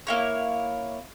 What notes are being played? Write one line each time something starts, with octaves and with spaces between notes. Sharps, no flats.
A#3 E4 C#5